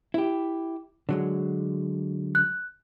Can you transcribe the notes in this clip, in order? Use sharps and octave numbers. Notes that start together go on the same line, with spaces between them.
E4 G4
D3 F#3 G#3
F#6